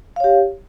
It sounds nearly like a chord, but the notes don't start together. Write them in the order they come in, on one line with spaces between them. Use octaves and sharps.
F5 C#5 G4